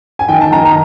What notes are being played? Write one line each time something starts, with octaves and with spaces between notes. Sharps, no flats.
G#5
D#3 G5
A5
D#3 A#5
A#5